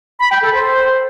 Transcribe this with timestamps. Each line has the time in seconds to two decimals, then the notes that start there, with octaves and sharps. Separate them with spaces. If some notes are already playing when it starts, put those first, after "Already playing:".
0.20 B5
0.31 G5
0.42 A4
0.54 C5